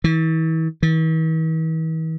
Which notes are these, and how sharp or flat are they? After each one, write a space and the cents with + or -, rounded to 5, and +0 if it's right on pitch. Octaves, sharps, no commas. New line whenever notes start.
E3 -40
E3 -45